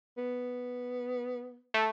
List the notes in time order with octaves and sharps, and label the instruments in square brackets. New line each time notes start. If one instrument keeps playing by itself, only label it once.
[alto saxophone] B3
[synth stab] A3